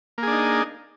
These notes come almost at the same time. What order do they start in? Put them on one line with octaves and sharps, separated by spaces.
A#3 G#4 D4 D#4